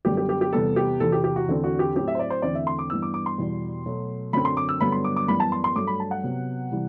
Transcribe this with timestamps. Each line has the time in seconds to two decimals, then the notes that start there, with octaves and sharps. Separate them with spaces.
0.05 F#2 D3 G3 B3 G4
0.17 G4
0.29 G4
0.41 G4
0.53 E2 C3 G3 B3 A4
0.76 G4
1.00 E2 C3 E3 A4
1.12 G4
1.24 G4
1.36 F#4
1.48 E2 D3 A3 C4
1.64 F#4
1.79 G4
1.95 A2 F#3 C4 G4
2.08 E5
2.15 C5
2.19 D5
2.30 C5
2.42 E2 D3 A3 C4 D5
2.55 E5
2.67 C6
2.79 D6
2.90 G2 E3 B3 E6
3.02 D6
3.14 D6
3.26 C6
3.38 E2 B2 G3
3.86 B2 F#3 A3
4.33 F#2 D3 F#3 C4 B5
4.45 C6
4.57 D6
4.69 E6
4.81 G2 D3 F#3 B3 B5
4.92 C6
5.04 D6
5.16 D6
5.28 F#2 E3 G3 B3 B5
5.40 A5
5.52 C6
5.64 C6
5.76 G2 F#3 A3 D6
5.87 B5
6.00 A5
6.11 F#5
6.23 C3 F#3 B3
6.71 C3 E3 G3